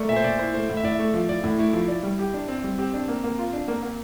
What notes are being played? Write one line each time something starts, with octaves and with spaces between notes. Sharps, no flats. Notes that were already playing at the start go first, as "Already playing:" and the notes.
Already playing: A3 A#4 D5
A#2 E5
C5
A#2 D5
E4 C5
A3 C5
A2
E5
A2 D5
E5
A3
F3
A2 D5
A2
A3 E4
F3
D5
G3
G4
D4
C4 D5
G3
C4 G4
D4
A#3
A#3
F4
D4
A#3
A#3